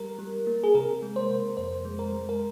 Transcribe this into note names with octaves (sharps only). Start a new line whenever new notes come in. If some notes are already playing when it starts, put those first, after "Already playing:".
Already playing: G3 A#4
G3
A#3
G#4
C3 A#4
G#3
C5
C3
F2 C5
G#3
A#4
G#3
A#4